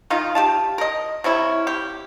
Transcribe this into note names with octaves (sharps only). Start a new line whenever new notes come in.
D#3 D#4 F4
G4 F5 A5
A#4 D#5
C3 C#4 E4
G4